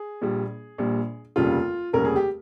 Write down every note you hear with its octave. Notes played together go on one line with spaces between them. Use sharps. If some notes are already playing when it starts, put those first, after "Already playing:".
Already playing: G#4
A#1 A#2 G3
A#1 A#2 G3
F1 D#2 C#3 G3 F4
F1 D#2 C#3 G3 A#4
G#4
G4